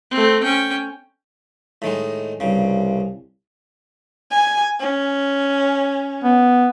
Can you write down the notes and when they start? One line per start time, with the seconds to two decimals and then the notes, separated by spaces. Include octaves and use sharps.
0.11 A3 C4
0.43 C#4 G5
1.82 A2 D#3 G#3
2.40 C2 G2 C#3
4.31 G#5
4.80 C#4
6.24 B3